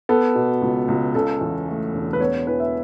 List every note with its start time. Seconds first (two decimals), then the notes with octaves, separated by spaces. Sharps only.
0.09 B3 A4
0.35 B2
0.62 C#2
0.88 C#2
1.15 C#3 A4
1.41 E2
1.68 A3
1.93 E1
2.13 B4
2.20 B3 C#5
2.47 E3 B4
2.60 E5